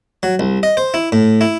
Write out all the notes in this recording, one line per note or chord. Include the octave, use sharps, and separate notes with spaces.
F#3
C2
D#5
C5
E4
A2
E4